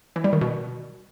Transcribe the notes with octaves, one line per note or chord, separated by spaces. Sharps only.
E3
G3
D#3
B2